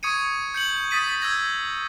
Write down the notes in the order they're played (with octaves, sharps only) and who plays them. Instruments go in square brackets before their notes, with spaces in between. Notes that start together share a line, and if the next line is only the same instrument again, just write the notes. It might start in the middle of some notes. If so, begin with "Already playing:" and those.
[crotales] C#6 D#6 G#6 C#7 D#7
G6 C#7 F#7
D#6 A6 B6 D#7
B6
E6 G6 G#6 A#6